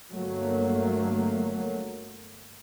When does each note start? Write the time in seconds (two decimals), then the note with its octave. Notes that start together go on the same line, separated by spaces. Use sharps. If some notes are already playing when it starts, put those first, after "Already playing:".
0.12 G1 F#3 A3 A#3